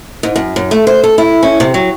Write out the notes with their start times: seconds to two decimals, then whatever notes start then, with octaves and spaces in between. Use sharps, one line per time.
0.23 G#2
0.36 F#2
0.56 F#2
0.71 A3
0.87 C5
1.03 A4
1.18 E4
1.43 C#4
1.60 C3
1.74 F#3